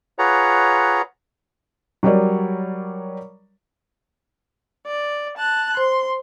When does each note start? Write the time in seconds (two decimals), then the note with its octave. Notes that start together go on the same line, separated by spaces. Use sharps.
0.19 F4 G#4 B4 C#5 F#5 A#5
2.03 F#3 G3 A#4 C#5 D5
4.86 D5
5.38 A5 F#6
5.77 C5 C6